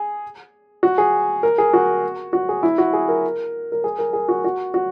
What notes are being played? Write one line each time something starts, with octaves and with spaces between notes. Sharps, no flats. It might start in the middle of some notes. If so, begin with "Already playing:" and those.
Already playing: G#4
F#4
G#4
A#4
G#4
F#4
F#4
G#4
E4
F#4
G#4
A#4
A#4
G#4
A#4
G#4
F#4
F#4
F#4